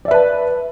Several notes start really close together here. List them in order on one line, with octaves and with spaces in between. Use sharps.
D5 E5 B4 A5